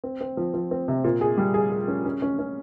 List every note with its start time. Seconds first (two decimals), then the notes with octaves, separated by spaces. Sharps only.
0.04 C4
0.21 C4
0.37 F3
0.54 F3
0.71 C4
0.88 C3
1.04 A#2
1.21 G#4
1.38 G3
1.54 G#4
1.71 G#4
1.88 C#4
2.05 C#4
2.22 C#4
2.39 C#4